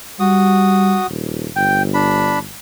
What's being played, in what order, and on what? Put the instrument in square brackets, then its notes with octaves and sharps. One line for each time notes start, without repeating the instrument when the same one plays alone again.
[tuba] G3 [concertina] F#4 D#6
[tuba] D#1
[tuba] G1 [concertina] G5
[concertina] D4 B5